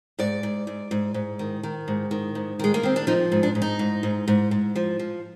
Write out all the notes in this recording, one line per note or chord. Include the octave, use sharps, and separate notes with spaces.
G#2 D5
G#2
G#2
G#2
G#2
D#3
D#3
G#2
D#3
G#2
D#3 G#3
A#3
D#3 C4
D4
F3 D#4
G#2
D4
G#2
D#4
G#2
G#2
G#2
G#2
F3
F3